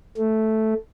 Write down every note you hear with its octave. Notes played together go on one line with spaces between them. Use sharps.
A3